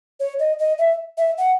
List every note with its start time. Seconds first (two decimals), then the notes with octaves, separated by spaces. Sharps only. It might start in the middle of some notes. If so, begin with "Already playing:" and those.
0.20 C#5
0.39 D#5
0.59 D#5
0.78 E5
1.17 E5
1.38 F#5